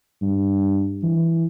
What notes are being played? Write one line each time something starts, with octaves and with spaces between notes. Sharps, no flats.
G2
E3